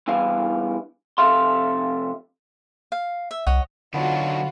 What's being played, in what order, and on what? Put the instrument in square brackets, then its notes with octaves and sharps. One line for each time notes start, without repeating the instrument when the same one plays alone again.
[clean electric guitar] E2 G2 E3 F5
F2 C3 A4 E5 F5 C6
[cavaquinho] F5
E5
[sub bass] C2 [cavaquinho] C#5 D#5 F#5
[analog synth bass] D3 [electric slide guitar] F#3 D4 D#4 [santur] B3 C#5 [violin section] F4 F#4